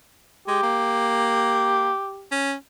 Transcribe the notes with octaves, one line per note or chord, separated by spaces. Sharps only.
G#3 G4
A#3
C#4